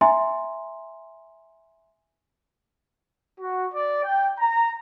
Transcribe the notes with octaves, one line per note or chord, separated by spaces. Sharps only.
E5 G#5 A#5 C6
F#4
D5
G5
A#5